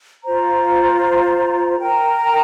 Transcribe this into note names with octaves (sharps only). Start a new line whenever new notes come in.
F4 C5 A#5
A#4 G5 A#5